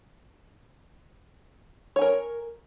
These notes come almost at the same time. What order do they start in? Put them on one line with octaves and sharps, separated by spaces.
C#5 G#5 A#4